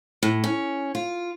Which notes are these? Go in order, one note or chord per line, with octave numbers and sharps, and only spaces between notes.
A2
C#4
F4